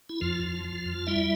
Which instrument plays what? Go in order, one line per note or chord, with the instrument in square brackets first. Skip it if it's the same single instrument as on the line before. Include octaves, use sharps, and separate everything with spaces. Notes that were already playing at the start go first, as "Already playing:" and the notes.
[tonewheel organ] E4
F2 F3 F4
F2
F3
F2
G3 E4 E5